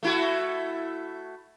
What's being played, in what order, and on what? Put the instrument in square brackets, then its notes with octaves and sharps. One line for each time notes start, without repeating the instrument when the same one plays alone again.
[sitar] A3 E4 F#4